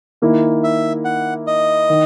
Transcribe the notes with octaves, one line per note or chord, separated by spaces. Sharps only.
D#3 A#3 E4
E5
F#5
D#5
D#3